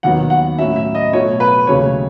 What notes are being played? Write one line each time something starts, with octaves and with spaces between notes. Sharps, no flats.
D#2 D#3 F#3 B3 F#5
F#5
A2 F#3 C#4 E5
E5
D#5
B2 F#3 A3 C#5
B4
D#2 C#3 F#3 A3 C#5